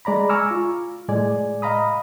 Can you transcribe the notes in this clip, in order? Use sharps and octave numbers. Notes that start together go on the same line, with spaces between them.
G#3 D5 A#5 B5
G#5 A#5 C#6 D6 E6 F6
F4
A2 G#3 D5 G#5
D#5 F5 A#5 B5 D#6